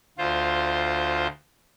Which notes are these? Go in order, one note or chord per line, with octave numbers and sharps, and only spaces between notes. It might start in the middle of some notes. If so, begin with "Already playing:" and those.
D2 F4 C5